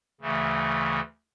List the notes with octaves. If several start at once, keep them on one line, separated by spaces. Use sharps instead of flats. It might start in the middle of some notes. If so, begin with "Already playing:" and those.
D2 C#3 E3 A3